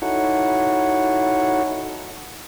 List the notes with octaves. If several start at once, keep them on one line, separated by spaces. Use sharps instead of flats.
D#4 E4 F#4 A4 C#5 F#5